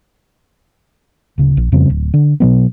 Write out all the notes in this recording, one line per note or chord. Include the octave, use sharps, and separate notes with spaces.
D1 C#3
A#1
F2 C#3 G3 C4
D1
D3
B2 F#3 B3